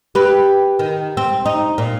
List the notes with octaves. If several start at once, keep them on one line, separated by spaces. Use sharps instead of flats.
G4 B4
D#3
C4
D#4
A#2